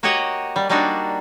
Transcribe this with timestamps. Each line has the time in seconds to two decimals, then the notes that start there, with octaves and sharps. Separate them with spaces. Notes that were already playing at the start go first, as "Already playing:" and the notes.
0.03 A#3 F#4 G4 C#5 D#5 F#5
0.56 G3
0.69 G3 A#3 D4 D#4 F#4